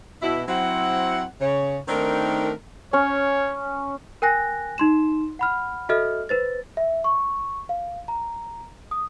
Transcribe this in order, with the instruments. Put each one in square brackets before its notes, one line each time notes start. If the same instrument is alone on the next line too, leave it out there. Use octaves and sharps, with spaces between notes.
[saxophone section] B2 E4
F#3 C4 E4 C5 F#5
C#3 C#5
D#3 A3 C4 D4 D#4 A#4
[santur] C#4 [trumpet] C#5
[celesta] A#4 G5 G#5 F#6 A#6
D#4 C6 E7
F#5 B5 F6
F#4 A4 D#5 E5 F6
B4 C5 A6
E5
C#6
F5
A#5
D#6